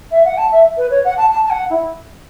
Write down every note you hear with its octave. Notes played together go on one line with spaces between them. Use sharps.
E5
F#5
A5
E5
B4
C#5
F#5
A5
A5
A5
F#5
E4